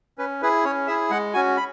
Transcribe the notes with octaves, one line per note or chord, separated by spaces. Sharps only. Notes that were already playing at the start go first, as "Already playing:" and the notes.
C#4 B4
E4 G#4 B4
C#4 C#5
E4 G#4 E5
G#3 F#5
C#4 F#4 G#5
B5